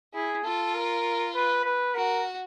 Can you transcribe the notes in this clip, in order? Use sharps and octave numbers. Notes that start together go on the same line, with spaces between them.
E4 G#4
F4 A4
A#4
B4
B4
F#4 A#4